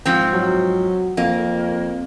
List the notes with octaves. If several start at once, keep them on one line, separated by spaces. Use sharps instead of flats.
G#2 F3 C4
F#3
F2 A#3